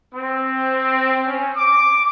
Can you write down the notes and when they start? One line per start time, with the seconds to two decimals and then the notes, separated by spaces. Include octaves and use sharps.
0.14 C4
1.28 C#4
1.57 D6